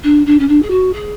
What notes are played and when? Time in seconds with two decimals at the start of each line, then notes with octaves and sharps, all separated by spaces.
0.03 D4
0.26 D4
0.39 C#4
0.48 D4
0.62 G#4
0.70 F#4
0.93 G#4